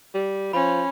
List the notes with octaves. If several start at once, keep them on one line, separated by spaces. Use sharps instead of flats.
G3
F3 C#4 B5